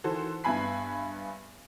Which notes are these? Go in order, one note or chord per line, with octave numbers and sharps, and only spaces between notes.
D#3 E3 F#4 A4 C5
G2 B3 E5 G#5 B5 C7